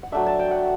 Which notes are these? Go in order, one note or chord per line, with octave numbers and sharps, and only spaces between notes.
F#5
F#3 A3 D4 E5
A5
G5
F#5